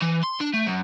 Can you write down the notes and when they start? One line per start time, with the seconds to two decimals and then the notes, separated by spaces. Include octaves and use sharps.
0.02 E3
0.23 C6
0.40 D4
0.53 A3
0.66 F#2